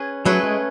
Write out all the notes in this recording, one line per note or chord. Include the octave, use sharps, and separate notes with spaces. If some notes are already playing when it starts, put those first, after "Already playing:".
Already playing: C#4 G#4 B4
F#3 A3 C#4 G#4 B4
G#3